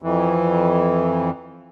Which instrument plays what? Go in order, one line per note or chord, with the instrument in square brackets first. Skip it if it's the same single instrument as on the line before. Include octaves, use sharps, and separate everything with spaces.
[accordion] F2 E3